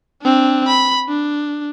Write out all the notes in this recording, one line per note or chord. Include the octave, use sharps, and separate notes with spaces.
C4 D4
B5
D4